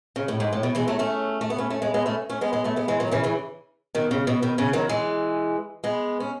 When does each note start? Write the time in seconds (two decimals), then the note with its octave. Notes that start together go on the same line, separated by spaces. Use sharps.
0.16 C#3
0.28 A2
0.40 G#2
0.53 A2
0.63 B2
0.75 E3 G#3
0.88 F#3 A3
0.99 A3 C#4
1.41 A3
1.50 B3
1.58 A3 C#4
1.70 A3 C#4
1.82 G#3 B3
1.94 G#3 B3
2.06 A3 C#4
2.30 A3 C#4
2.41 G#3 B3
2.53 G#3 B3
2.64 F#3 A3
2.76 G#3 B3
2.88 E3 G#3
3.00 D#3 F#3
3.11 C#3 E3
3.24 C#3 E3
3.95 B2 D#3
4.11 C#3
4.27 B2
4.42 B2 D#3
4.58 C#3 E3
4.73 D#3 F#3
4.89 E3 G#3
5.84 G#3 B3
6.20 C#4